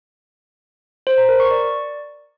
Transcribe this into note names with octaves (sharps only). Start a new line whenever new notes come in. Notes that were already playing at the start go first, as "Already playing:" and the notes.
C5
A#5
A#4
C#6
D5